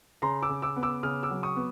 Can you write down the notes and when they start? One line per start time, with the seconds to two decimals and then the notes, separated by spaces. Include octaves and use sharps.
0.22 C#3 A#5 C6
0.42 D6 E6
0.49 C#3
0.62 D6 E6
0.76 B3
0.83 D6 E6
1.03 C#3 D#6 F6
1.23 D6 E6
1.30 F#3
1.43 C#6 D#6
1.56 B3